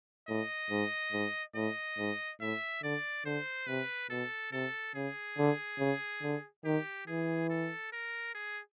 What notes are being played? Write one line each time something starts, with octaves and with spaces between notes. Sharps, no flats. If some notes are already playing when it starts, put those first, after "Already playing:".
A2 D#5
G#2
G#2
A2 D#5
G#2
A2 E5
D3 D5
D3 C5
C3 B4
B2 A4
C3 A4
C#3 G#4
D3
C#3
D3
D#3 G4
E3 G#4
A4
A#4
G#4